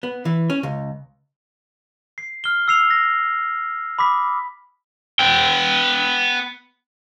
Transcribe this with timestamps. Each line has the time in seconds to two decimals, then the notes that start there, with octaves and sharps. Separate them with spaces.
0.03 B3
0.25 E3
0.50 C#4
0.63 C#2
2.18 C7
2.44 F6 G7
2.68 E6 C7 F7
2.90 A#6
3.99 B5 D6 D#6 B6
5.19 B3 G5